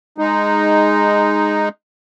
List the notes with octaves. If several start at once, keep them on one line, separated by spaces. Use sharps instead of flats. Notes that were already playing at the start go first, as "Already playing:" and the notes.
G#3 D#4